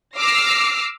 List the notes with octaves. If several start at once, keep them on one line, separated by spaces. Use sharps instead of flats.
D6 E6 F6 A#6 C7